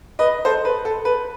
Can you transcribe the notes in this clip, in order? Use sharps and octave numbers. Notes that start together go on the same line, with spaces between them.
B4 D#5
A4 C5
B4
A4
B4